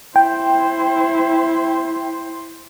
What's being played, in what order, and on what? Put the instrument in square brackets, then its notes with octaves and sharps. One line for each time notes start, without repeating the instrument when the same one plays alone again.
[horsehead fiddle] E4 C5 [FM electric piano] G5